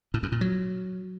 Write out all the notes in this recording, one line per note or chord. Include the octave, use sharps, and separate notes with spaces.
A2
F#2
A#2
F#3